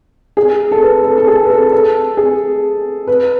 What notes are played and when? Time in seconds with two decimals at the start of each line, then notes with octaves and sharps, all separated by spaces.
0.37 G#4
0.71 A4
0.82 B4
1.04 A4
1.18 A4
1.27 G#4
1.45 B4
1.50 A4
1.72 A4
2.17 G#4
3.07 B4